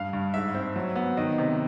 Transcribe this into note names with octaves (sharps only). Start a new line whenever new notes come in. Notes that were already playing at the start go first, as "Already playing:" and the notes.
Already playing: G2 F5
G2
G#2 E5
C4
F#3
B3
D#3 D#5
C3